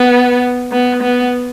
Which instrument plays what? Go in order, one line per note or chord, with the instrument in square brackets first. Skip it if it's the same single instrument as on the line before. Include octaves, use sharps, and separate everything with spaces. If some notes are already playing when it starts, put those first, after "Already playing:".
Already playing: [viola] B3
B3
B3